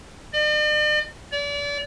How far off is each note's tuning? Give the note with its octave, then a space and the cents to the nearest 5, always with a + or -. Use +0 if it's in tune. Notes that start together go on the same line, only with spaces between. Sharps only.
D5 +45
D5 -35